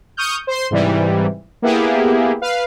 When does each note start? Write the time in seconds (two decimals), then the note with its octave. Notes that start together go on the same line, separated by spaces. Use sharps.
0.17 C#6 D#6 F6 G6
0.47 C5 C6
0.71 G#2 C3 E3 G3
1.62 A#3 B3 E4 G4 G#4
2.42 B4 F5